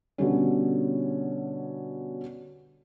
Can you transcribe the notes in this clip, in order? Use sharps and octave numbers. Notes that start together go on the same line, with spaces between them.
B2 D3 G3 C#4